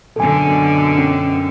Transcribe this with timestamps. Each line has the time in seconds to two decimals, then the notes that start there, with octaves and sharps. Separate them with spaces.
0.16 F#2 B2 D3 A4 G#5
0.98 C#4